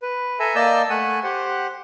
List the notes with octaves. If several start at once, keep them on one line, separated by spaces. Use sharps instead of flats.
B4
A4 E5 G#5 A#5
A#3 D5 D#5 A5 E6 G6
A3 F#5 G#5
G4 C5 F#5